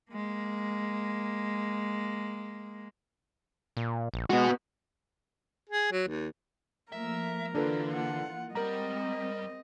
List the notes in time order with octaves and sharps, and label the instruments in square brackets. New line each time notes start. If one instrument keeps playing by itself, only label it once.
[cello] G#3 A#3
[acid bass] A#2
A#1
[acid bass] G#3 [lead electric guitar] B3 F#4
[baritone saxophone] G#4
F#3
D#2
[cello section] F3 A3 A#3 [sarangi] A#4 [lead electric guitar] E5
[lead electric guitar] D3 [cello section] E3 A#3 F4 [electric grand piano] D4 A4 B4
[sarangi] F#5
[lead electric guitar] G3 [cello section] G#3 C4 [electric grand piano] A#4 A#5 [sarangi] D#5